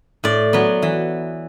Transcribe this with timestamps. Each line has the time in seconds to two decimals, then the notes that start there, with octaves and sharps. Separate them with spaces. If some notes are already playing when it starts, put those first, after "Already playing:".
0.24 A2 D5
0.53 F#3 B3
0.82 E3